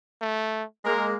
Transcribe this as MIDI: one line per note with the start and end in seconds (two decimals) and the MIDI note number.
0.21 0.63 57
0.85 1.15 56
0.85 1.15 58
0.85 1.07 70